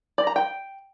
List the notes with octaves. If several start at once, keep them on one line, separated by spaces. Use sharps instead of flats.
D5
A#5
G5